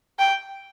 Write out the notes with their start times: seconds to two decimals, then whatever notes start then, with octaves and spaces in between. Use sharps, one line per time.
0.19 G5